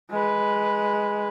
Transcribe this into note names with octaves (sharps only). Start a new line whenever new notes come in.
G#3 B4